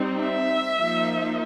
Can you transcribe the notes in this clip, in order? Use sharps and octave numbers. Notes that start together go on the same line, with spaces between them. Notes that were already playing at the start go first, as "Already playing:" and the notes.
Already playing: G3 C4 D#4
E5
F3 A#3 D#4